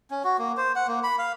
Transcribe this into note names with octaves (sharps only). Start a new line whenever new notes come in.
C#4
F#4
A#3
C5
F#5
A#3
B5
F5